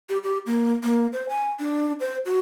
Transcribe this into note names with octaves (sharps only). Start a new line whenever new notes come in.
G4
G4
A#3
A#3
C5
G#5
D4
C5
F#4